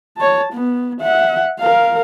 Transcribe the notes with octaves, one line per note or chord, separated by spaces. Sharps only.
C#5 A5
B3
E5 F#5
A#4 F5